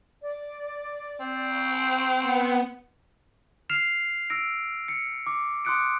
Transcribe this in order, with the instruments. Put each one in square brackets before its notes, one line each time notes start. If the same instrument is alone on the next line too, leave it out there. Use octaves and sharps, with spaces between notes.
[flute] D5
[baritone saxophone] C4
[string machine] B3 [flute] F#5
[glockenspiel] F6 C7 E7 F7
E6 A#6 D7
C#7
D6
C6 D6 D#6 F#6 C#7 D7